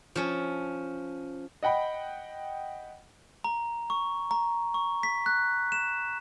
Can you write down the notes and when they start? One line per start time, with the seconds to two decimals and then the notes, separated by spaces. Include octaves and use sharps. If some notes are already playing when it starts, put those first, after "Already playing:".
0.16 F3 C#4
1.63 D#5 F#5 G5 B5
3.44 A#5
3.90 C#6
4.31 A#5
4.74 C#6
5.03 B6
5.26 F#6
5.72 E7